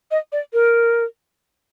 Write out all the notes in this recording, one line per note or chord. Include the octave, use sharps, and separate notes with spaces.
D#5
D5
A#4